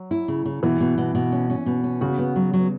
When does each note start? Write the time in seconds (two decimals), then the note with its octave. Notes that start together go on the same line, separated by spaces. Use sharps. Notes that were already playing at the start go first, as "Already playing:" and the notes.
Already playing: F#3
0.11 E4
0.28 C#3
0.45 C#3
0.63 B2 E3
0.80 B2
0.98 B2
1.15 B2
1.32 C#4
1.50 C#4
1.66 B2
1.84 C#4
2.01 C#3 F#4
2.18 B3
2.36 F#3
2.53 F#3